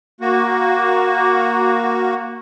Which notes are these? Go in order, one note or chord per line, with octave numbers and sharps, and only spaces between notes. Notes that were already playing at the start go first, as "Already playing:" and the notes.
A#3 F#4